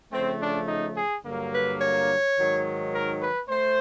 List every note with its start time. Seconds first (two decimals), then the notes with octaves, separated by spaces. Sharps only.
0.12 C#3 F3 A3 C4
0.40 D4
0.68 D#4
0.96 G#4
1.25 G2 D3 F#3 A#3
1.53 B4
1.81 C#5
2.37 G#2 D#3 F#3
2.93 A#4
3.22 B4
3.49 A3 C5